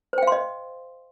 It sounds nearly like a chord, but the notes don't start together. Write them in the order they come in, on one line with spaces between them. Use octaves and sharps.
C5 G5 F5 C6 D#5